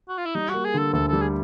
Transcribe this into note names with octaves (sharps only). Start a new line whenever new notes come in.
F#4
F4
E4
G3 D#4
A#3 F#4
G#4
D3 A4
D2 A4
G3 A4
G#4